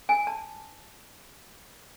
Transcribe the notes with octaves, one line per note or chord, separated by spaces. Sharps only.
G#5
A5